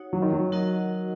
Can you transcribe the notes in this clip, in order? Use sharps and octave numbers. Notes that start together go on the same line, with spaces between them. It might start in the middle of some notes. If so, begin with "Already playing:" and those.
Already playing: D#4 F#4 C#5 F#5
F#3
D#3
F#3
D#4 F#4 A#4 D#5 F#5